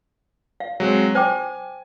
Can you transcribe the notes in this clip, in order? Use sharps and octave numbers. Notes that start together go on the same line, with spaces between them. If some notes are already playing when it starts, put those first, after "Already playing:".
F5
F#3 G#3 C4
C5 G5 G#5 D6